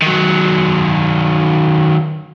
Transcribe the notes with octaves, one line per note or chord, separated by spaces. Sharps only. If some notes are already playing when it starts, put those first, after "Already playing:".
D#3 F#3